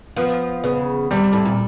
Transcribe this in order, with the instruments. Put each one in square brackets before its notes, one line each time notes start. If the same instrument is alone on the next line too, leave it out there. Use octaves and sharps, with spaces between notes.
[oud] F3 [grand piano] B3
[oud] C#3 [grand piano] B3
[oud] C3 [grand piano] G3
[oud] A2
A#2